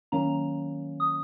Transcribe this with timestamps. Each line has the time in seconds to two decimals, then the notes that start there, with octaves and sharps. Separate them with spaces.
0.12 D#3 F#3 A#3 C#4 A#5
1.00 D#6